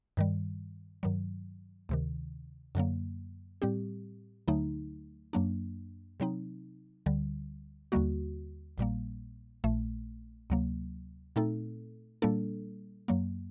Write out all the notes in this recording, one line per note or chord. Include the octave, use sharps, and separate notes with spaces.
G2 D#3 G3
G2 D#3 F#3
D2 C3 D#3
F#2 D3 F#3 A#3
A2 G3 C4 G4
D2 D3 F#3 A3 D#4
F#2 F#3 A#3 D4
C3 F#3 C4 D#4
D2 D3 G3
D#2 D3 G3 A#3 F#4
A#1 A#2 G3 A#3
A#1 A#2 A3
D2 C3 F#3 A#3
A#2 A3 C4 D#4 A4
A#2 G3 A#3 D4 A4
F#2 F#3 A#3